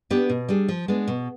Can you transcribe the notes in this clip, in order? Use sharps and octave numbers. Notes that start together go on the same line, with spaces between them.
B3 D4 G4 B4
B2
G3 D4 G#4
F3
G#3 B3 D4
B2